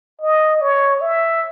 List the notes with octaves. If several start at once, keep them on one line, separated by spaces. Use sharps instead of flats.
D#5
C#5
E5